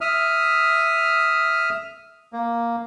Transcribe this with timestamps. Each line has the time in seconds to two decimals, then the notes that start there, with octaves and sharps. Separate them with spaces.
0.01 E5 D#6 F6
2.33 A#3